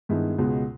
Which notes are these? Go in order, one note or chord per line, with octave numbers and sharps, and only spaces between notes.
G2 D#3 G#3 B3 E4
C#2 B2 G#3 B3